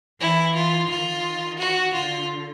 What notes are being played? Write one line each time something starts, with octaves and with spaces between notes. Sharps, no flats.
E3 E4
F4
D#3 F4
F#4
D3 F4